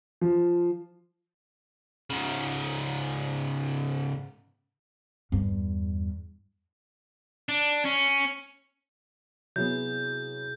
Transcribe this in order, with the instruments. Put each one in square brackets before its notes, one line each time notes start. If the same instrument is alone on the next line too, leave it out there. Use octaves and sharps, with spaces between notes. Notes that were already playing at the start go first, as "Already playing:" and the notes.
[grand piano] F3
[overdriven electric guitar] G#2 C#3
[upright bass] E2 G2
[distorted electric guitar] D4
C#4
[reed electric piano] C3 E4 G#4 [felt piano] F#3 B3 [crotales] G6